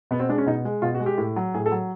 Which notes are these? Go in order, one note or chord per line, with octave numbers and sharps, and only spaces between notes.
B2 B3
C4
G#3 D4
C#4
B2 D#4
G#3
B2 F4
F#4
G#3
G4
A2
F#3
A2 G#4
A4
F#3